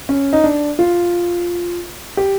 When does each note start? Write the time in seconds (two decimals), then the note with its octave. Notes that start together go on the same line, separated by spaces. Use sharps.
0.09 C#4
0.33 D#4
0.44 D4
0.79 F4
2.17 G4